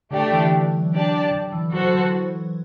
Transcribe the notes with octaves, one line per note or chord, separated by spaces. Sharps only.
D3 A3 D4 G4 D5
E3
F#3
D4 G4 D5 A5
D3
E3
F#3 F#4 A4 C5
E3
F#3